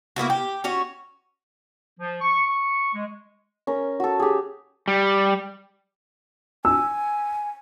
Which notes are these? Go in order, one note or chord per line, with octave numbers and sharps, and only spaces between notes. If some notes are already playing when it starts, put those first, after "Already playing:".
A#3 B3 E4 F#4
G4
C#4 F#4 C#5
F3
C#6
C#6
G#3
C#4 A#4
F#4 A4
G4 G#4
G3
G#5 E6